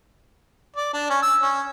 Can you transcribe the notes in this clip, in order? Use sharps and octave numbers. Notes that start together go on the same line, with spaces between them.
D5
D4
C#4
E6
C#4